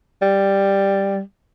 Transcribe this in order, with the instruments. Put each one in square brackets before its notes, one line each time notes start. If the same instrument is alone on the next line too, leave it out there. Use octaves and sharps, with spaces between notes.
[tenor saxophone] G3